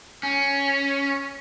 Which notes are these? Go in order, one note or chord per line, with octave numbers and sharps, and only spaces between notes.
C#4